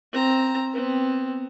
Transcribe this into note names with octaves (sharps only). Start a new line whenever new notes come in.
C4 A#5
B3 C4